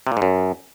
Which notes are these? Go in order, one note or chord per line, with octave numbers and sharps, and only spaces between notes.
C3
A#2
G#2
F#2